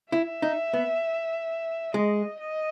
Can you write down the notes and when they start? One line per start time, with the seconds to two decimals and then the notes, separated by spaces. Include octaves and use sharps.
0.12 E4 E5
0.42 D#4
0.74 B3
1.94 G#3 D#5
2.40 D#5